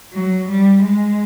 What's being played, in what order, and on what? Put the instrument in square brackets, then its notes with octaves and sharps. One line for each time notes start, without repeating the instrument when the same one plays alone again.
[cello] F#3
G3
G#3